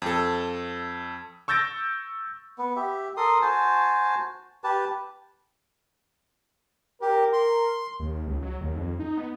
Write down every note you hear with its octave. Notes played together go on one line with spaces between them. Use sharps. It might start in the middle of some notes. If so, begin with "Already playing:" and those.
F2 A4
C#6 E6 G6 A6 A#6 D7
B3
G4 E5
A4 A#4 C6 D#6
F#4 C5 G#5 A5
G4 B4 A5
G4 A#4
C6
D#2
C#2
F#3
D#2
F2
D#4
B3